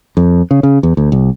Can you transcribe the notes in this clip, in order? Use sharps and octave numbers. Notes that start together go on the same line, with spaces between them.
F2
C#3
C#3
E2
D2
C2